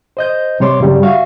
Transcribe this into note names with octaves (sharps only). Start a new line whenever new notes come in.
C5 D#5 G6
C3 G3 C#5 C6 D6
G2 C#3 F#3 G3
F#4 E5 F5 C#6